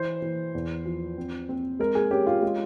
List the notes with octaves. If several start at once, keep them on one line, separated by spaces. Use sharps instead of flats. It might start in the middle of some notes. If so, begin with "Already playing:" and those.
Already playing: E3 C5
E3
E2
F3
C4
C4
G#3 A#4
G#4
C#4 G4
F4
G#3